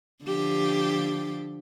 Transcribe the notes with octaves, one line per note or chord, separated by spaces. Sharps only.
D3 F3 G4